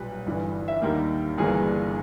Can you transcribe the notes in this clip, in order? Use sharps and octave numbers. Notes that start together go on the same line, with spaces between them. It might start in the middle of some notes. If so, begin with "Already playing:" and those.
Already playing: B1 A#2 G3 B4
G1 G2 E3
E5
D#2 D#3 G3 A#3
G1 G2 E3 A#3 G#4